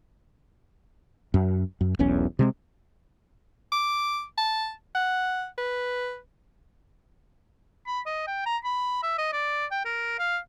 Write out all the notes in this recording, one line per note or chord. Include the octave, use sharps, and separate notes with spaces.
F#2
F#2
E1 B1 E2 C#4
C3 G#3 C4
D6
A5
F#5
B4
B5
D#5
G5
A#5
B5
E5
D#5
D5
G5
A#4
F5